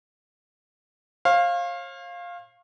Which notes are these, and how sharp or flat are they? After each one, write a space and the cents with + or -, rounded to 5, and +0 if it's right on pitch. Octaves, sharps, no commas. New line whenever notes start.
C#5 -45 F5 +0